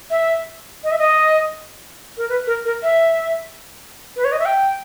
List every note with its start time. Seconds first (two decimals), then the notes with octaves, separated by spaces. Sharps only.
0.10 E5
0.84 D#5
0.91 E5
0.99 D#5
2.17 A#4
2.29 B4
2.47 A#4
2.65 A#4
2.83 E5
4.16 B4
4.25 C#5
4.32 D#5
4.39 E5
4.46 G5